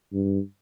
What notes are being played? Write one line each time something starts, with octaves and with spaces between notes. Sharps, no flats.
G2